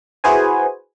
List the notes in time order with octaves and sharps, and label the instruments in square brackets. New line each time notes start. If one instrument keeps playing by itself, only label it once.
[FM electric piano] E4 F#4 G#4 B4 C5 G#5